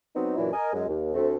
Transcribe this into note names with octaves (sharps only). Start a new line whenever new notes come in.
F#3 B3 C4 D#4
F#2 A#2 E3 F#3 D4 E4
A#4 D#5 G#5
F#2 G#3
D#2
D2 A3 C4